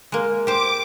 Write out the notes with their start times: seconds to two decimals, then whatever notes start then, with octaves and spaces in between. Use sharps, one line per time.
0.12 G#3 A#3
0.47 G4 C5 D6